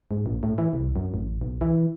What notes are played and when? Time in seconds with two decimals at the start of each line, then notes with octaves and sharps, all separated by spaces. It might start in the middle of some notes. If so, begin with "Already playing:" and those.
0.11 G#2
0.26 A#1
0.43 A2
0.58 E3
0.73 C2
0.96 F#2
1.14 A1
1.41 B1
1.61 E3